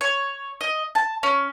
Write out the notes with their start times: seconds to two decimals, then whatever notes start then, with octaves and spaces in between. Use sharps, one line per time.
0.01 C#5
0.61 D#5
0.95 A5
1.23 C#4